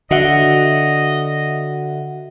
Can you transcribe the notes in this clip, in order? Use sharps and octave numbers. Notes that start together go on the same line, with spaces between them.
D3 F#4 D#5 E5 F#5